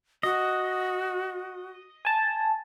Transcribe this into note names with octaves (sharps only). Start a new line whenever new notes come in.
F#4 D#5
G#5 A5